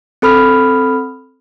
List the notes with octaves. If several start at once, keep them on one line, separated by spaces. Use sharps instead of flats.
C4 A4 B5 F6